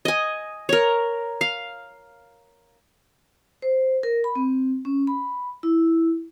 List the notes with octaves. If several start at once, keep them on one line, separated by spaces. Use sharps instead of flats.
D#5 G#5
A#4 C#5
F5
C5
A#4
B5
C4
C#4
B5
E4